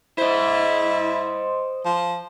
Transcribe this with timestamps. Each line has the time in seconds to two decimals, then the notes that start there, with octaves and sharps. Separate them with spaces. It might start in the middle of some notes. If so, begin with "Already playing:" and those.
0.18 E4 C5 D#5
1.85 F3